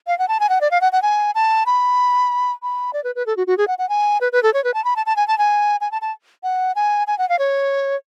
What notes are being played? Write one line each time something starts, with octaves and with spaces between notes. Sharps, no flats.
F5
F#5
A5
G#5
F#5
D5
F5
F#5
F#5
G#5
A5
B5
B5
D5
B4
B4
A4
F#4
F#4
G#4
F#5
F#5
G#5
B4
B4
A4
C#5
B4
A5
B5
A5
A5
G#5
A5
G#5
G#5
A5
A5
F#5
G#5
G#5
F#5
F5
C#5